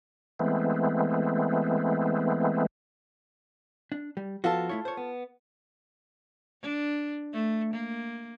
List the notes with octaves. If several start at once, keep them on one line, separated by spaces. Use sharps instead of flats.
E3 G#3 A3 B3 C4
D4
G3
F3 B3 F4 F#4 A4 A5
A3 E4 C#5
C5 C#5
B3
D4
A3
A#3